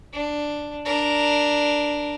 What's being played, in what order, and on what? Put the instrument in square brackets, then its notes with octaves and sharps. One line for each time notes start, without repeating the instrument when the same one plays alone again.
[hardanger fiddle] D4
D4 A#4